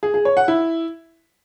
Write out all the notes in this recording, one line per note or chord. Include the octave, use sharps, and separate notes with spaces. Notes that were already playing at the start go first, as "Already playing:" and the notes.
G#4
G#4
C#5
F#5
E4